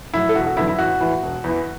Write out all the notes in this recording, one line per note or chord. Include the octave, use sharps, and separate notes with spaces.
A2 F#3 E4
A4
E1 F#4
F#4
E2 D3 F#3 E4
E4
A1 F#4
A2 E3
E1
E2 E3